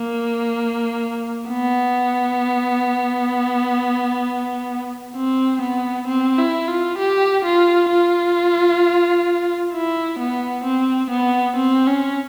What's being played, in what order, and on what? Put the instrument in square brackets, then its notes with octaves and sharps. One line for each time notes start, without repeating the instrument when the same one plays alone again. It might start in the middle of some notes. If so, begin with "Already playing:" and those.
Already playing: [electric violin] A#3
B3
C4
B3
C4
E4
F4
G4
F4
F4
E4
B3
C4
B3
C4
C#4